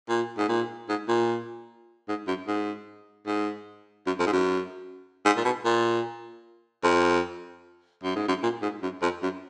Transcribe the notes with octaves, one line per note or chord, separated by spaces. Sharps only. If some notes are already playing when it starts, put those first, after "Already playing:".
A#2
G#2
A#2
G#2
A#2
G#2
F#2
G#2
G#2
F#2
F2
G#2
F#2
G#2
A#2
B2
A#2
F2
F#2
G#2
F#2
A#2
G#2
F#2
F2
F#2